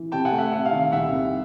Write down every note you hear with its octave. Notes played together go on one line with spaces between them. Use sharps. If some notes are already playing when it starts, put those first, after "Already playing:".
Already playing: E3
C3 G5 A5
F#5 G#5
A3
E5 F#5
C3 E5 F#5
F5
D#3
F5
C2 E5 F#5
C2